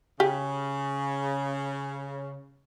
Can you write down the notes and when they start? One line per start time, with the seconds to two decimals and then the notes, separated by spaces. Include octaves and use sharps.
0.20 C#3 G4 G#4